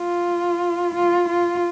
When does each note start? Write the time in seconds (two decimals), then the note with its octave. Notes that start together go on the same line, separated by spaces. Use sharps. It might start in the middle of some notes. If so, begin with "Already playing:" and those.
Already playing: F4
0.95 F4
1.29 F4